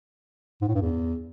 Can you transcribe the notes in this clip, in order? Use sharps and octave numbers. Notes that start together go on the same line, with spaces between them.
G#2
A2
G2
E2